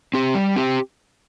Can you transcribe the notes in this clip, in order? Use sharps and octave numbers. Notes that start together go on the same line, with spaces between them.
C4 G4
G3
C4 G4